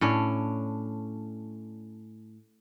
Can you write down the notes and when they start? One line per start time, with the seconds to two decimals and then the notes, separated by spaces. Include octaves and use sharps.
0.01 A2 C#4 D4